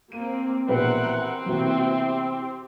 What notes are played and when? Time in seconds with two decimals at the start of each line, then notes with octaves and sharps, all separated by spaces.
0.12 A#3 C4 D#7
0.68 A#1 B2 E3 C4 G4 A#4 B4 F#5
1.46 C3 E3 A#3 B3 E4 F#4
1.92 G4